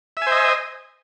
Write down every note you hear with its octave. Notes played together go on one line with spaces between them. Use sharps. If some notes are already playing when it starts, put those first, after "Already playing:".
C5 D#5 E5 G#5